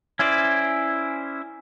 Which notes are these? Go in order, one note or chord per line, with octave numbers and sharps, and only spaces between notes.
C#4 E4 C5 D5